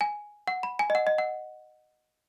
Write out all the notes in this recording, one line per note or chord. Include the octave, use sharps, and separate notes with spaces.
G#5
F#5
B5
G#5
D#5
F#5
D#5
F#5